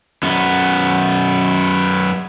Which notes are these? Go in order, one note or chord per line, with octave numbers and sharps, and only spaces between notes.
F#2 B3